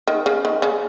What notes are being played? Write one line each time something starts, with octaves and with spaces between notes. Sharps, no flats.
D#3
C#3
D#3
C#3